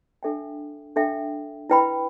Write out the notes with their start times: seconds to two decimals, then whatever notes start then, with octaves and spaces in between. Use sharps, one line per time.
0.23 D4 A4 E5 G5
0.96 D4 A4 E5 G5
1.70 E4 B4 G5 B5